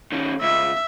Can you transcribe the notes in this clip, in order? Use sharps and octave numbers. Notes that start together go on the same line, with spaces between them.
D#3 C#4
C#2 E5